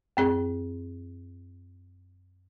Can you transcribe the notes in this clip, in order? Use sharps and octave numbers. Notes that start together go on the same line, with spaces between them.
F#2 C4 G#4